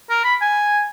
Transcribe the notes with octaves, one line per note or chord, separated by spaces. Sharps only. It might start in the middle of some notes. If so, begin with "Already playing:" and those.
A#4
B5
G#5